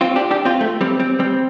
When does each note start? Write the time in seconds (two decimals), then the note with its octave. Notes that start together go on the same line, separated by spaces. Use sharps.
0.01 C4 F4
0.16 D4 G4
0.31 D4 G4
0.45 C4 F4
0.61 A3
0.81 G3 C4
1.00 G3 C4
1.19 G3 C4